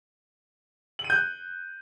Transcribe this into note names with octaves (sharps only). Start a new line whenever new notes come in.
F#7
D#7
G6
F#6